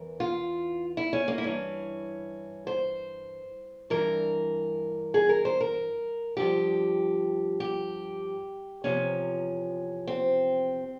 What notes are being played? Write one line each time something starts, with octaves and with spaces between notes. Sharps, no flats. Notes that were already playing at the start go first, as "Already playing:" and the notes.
Already playing: E2 E3 A#4
F4
E4
C#4
A#3
E4
G2 E3 C#4
C5
G2 E3 A#4
G#4
A#4
C5
A#4
G2 F3 G4
G4
E2 C3 F3 C#4
C4